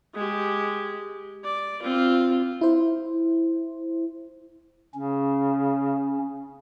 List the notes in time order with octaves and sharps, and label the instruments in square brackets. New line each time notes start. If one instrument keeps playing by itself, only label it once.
[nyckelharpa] G#3 G4
D5
C4 F4
[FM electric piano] E4 C5
[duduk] C#3 [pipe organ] C#4